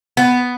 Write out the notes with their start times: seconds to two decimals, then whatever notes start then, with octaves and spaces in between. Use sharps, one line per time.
0.17 B3